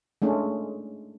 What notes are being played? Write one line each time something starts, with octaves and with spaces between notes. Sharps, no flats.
G#3 A3 C#4 D4